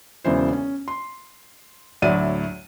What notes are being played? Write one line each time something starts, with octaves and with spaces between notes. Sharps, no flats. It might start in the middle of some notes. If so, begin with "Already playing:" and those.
E1 C#3 E3 C5
C#4
C6
D2 A2 F#3 D5 E5 D#7